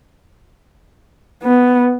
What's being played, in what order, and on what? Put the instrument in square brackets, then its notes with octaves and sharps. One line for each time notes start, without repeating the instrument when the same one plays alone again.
[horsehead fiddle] B3